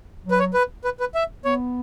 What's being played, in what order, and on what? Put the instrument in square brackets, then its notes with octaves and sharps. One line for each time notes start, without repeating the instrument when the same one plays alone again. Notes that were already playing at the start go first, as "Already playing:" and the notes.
[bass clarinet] F#3
[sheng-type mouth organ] B4
C#5
B4
B4
B4
E5
[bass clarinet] B3 [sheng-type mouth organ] C#5